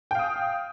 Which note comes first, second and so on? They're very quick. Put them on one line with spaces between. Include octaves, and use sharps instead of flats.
G5 F5 D#6